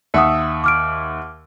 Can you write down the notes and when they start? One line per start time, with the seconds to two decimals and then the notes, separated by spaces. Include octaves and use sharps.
0.14 D#2 E5 F#5 D#6 C#7
0.64 D6 F6 D7